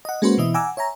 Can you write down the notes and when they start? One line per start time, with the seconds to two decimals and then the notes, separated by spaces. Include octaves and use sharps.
0.05 D#5 F#5
0.22 G#3 A#3 C#4 F#4 B4 C5
0.38 B2 E3 D#5 E5
0.54 F#5 G#5 A#5 D6 E6
0.77 C#5 E5 G#5 A#5